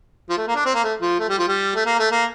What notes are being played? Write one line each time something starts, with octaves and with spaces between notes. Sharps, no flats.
F3
A3
A#3
D4
C4
A#3
A3
F3
A3
G3
F3
G3
A3
A#3
A3
A#3